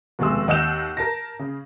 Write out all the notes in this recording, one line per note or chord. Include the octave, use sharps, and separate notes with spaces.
F1 D#2 B2 G#3 C6 E6
D#2 D#5 F#5 E6 G6 E7
A#4 A5 A#6
C#3